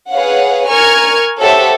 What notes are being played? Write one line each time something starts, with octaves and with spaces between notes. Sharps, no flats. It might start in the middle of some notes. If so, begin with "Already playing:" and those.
G#4 B4 C#5 F5 F#5
A#4 G#5 C#6 F6 G#6
G4 A4 C5 C#5 E5 F#5